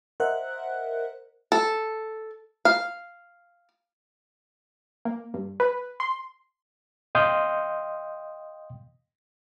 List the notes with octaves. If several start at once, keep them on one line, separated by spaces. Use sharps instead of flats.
A#4 C5 D#5 E5 F#5 F#6
A4
F5
A#3
G2
B4
C6
D#5 F5 G5 C6 D#6 G6